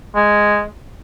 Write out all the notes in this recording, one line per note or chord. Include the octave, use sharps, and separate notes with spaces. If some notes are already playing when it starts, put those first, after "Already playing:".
G#3